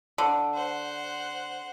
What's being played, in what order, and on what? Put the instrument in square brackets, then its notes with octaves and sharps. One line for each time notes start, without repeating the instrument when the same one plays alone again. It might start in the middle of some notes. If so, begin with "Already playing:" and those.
[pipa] D3
[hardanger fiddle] C5 F#5